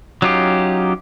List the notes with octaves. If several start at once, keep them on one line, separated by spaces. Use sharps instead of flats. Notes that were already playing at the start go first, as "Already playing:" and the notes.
F#3 C#4 D#4 F4 G4